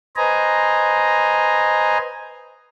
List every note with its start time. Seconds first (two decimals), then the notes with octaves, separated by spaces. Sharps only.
0.16 B4 C5 D#5 G#5 A#5